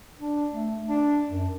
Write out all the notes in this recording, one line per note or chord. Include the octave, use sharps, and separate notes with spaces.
D4
A3
D4
F#2